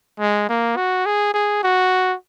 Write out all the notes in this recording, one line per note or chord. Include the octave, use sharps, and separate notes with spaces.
G#3
A#3
F#4
G#4
G#4
F#4